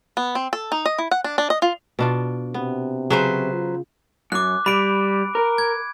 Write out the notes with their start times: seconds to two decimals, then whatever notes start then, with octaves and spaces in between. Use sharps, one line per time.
0.17 B3
0.35 C4
0.53 A4
0.72 D#4
0.86 D#5
0.98 E4
1.11 F#5
1.24 D4
1.38 D4
1.50 D#5
1.62 F4
1.99 B2 D4 F4
2.54 C3 B3
3.10 C#3 F#3 B4 C5 F#5
3.53 F4
4.32 F#2 D6 F#6
4.66 G3 B5 D7
5.35 A#4
5.58 G#6